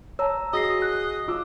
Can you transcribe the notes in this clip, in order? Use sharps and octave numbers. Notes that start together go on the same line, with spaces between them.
C#5 A5 A#5 E6
F#4 G#4 D#5 D#6 A#6 C7
F#6
F4 D6 E6